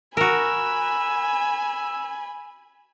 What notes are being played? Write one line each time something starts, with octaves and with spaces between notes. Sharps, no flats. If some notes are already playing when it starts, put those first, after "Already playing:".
F#4 A#4 G#5 B5 E6